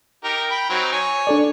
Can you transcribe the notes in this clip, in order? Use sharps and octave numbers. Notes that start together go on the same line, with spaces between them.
D#4 G4 A#4
G5 B5
F#3 C4 D#4
C#5 G#5
D4 A4 D5